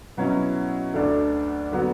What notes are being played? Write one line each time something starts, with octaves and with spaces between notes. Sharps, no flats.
B2 F#3 C#4 E4
D2 D3 A3 D4
D3 F#3 B3 F#4